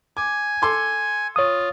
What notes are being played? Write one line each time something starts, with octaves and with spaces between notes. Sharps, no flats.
G#5 D6
A4 C6 D6
F4 C#5 D#6